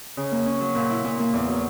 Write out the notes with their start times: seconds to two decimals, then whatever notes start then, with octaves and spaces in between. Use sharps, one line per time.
0.17 C#3
0.32 A#3
0.46 C#4
0.61 F#3
0.75 A#2
0.90 E4
1.05 A#2
1.19 A#3
1.33 E2
1.48 F#3